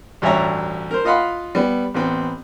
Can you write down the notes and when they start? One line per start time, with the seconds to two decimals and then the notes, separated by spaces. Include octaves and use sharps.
0.22 A1 D2 G2 C#5 E5 A#5
0.91 A#4 C5
1.04 F4 D#5 F5 F#5 B5 C6
1.55 G3 B3
1.95 A1 B3 C4